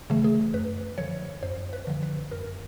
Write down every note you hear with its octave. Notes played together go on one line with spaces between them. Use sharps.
C#3 E3 A3
G#4
F#2 B4
D3 F3 C#5
F#2 C5
B4
D3 F3
B4
F#2 A#4